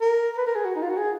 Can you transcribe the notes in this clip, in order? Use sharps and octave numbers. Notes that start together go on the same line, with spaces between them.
A#4
B4
A#4
G#4
F#4
D#4
F4
F#4
G#4